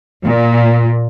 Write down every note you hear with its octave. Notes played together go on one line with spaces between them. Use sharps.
A#2